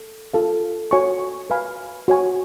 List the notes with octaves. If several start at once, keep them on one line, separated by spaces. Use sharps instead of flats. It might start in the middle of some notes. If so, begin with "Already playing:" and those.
Already playing: A4
F4 A4 F5
F#4 C#5 G#5 C#6
B4 F5 G#5 B5
F#4 C#5 G#5 C#6